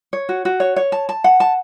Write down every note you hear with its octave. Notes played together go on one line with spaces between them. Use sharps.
C#5
F#4
F#4
C#5
C#5
A5
A5
F#5
A5